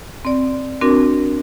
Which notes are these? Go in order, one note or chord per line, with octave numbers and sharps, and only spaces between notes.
C4 D5
C4 D4 F#4 A#4